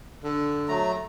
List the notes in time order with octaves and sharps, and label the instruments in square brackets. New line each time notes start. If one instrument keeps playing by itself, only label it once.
[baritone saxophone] D3
[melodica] F#3 A3 A#5